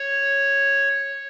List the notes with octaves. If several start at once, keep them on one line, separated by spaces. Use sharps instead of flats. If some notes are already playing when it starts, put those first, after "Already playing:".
Already playing: C#5